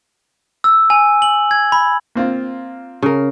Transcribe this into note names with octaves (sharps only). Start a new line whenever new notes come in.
E6
G#5
F#7
G#6
B5
A#3 C4 F4
C#3 A#4